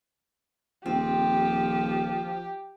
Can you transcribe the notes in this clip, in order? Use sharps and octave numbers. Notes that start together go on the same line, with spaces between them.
D#1 F3 C4 G4